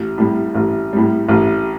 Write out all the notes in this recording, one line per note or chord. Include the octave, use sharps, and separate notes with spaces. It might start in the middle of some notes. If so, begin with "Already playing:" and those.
Already playing: A1
A2 G3
A1
A2 G3
A1